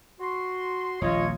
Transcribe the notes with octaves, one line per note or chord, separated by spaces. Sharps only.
F#4 C6
D#1 A#1 F4 C#5 D#5